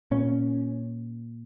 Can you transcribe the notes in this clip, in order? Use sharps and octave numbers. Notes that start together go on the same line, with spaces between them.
A#2 C#4